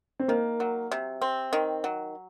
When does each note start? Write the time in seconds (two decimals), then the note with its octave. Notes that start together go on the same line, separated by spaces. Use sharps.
0.20 C4
0.28 D#3 A#3
0.60 F#3
0.91 C3
1.22 C4
1.53 D#3
1.84 F#3